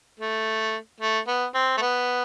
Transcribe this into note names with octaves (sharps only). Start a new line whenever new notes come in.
A3
A3
B3
C4
A3
B3